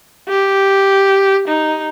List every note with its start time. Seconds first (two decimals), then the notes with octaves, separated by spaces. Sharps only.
0.29 G4
1.48 D#4